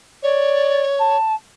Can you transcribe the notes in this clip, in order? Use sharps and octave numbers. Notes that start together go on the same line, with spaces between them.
C#5 D5
A5